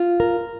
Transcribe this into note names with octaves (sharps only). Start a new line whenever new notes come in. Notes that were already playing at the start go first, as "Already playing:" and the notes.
Already playing: F4
A#4